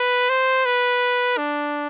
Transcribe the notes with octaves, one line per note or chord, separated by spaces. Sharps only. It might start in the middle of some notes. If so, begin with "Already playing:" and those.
Already playing: B4
C5
B4
D4